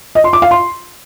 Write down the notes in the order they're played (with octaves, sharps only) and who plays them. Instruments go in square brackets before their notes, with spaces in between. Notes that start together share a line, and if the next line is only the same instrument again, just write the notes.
[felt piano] D#5
C6
D6
F5
C6